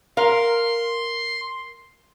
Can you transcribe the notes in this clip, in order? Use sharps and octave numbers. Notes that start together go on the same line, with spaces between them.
A#4 F5 C6